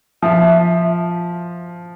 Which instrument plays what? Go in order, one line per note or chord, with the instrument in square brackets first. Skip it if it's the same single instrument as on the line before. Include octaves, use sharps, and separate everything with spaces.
[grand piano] F3 [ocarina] E5